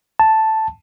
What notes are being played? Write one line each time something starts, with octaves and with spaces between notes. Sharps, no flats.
A5